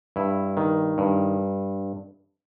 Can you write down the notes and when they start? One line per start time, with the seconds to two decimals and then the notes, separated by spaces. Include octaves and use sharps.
0.16 G2 E4
0.57 D#3
0.98 G2